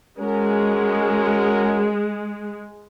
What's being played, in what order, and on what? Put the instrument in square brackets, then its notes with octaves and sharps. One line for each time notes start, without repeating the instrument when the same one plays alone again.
[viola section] G#3 [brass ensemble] C#4 F#4 A#4